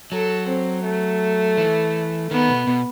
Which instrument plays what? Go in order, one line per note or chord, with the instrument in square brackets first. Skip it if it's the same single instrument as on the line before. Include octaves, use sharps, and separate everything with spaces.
[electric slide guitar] F#3 [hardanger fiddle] A4
[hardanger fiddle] C4
A3
[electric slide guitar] E3
[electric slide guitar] D#3 [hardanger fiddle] B3
[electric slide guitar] B2
B2